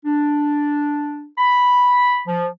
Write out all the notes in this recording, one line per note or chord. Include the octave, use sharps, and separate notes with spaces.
D4
B5
F3